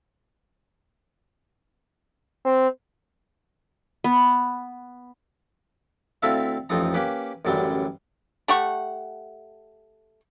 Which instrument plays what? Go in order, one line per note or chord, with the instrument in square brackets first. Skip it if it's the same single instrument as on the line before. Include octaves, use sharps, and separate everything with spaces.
[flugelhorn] C4
[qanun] B3
[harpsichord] D2 C4 E4 A4 E5 F5
A1 F2 F3 C4 D#4 A#5
A#3 C#4 G4 B4
A1 F#2 D3 F#3 G3
[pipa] A3 G4 F#5 C#6